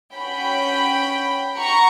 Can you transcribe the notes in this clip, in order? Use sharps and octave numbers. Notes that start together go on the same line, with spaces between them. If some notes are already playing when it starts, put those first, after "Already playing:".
C#4 F#4 G5 B5
F#4 A#5 C#6